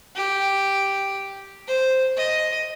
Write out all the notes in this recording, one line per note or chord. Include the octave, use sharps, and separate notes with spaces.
G4
C5
D#5